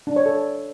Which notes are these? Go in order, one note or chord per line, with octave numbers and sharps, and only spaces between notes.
D4
C#5
A4